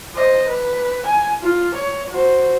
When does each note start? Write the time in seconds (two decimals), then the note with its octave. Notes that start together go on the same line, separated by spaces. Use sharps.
0.15 C5 D#5
0.49 B4
1.06 G#5
1.43 F4
1.74 C#5
2.11 F#4 C5